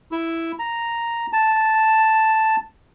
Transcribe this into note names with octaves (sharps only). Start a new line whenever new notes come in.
E4
A#5
A5